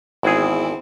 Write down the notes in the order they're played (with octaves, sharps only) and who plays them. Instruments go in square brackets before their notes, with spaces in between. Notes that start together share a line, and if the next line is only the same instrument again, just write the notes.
[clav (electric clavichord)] G#1 G#4 [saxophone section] E2 C4 E4